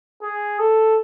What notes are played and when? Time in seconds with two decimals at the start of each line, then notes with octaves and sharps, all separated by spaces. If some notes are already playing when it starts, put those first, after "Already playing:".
0.22 G#4
0.59 A4